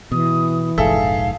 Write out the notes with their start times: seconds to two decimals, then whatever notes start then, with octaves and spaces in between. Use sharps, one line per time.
0.12 B2 E3 D#6
0.78 F1 A#1 G#2 G#4 A4 E5 F5